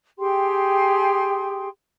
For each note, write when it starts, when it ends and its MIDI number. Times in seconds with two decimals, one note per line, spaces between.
0.18 1.67 67
0.18 1.67 68
0.18 1.67 79
0.18 1.67 84